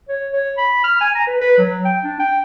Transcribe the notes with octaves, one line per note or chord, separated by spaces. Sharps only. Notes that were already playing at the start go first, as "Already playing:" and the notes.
C#5
C#5
B5
F6
G#5
A#5
B4
B4
F#3
G5
D4
G5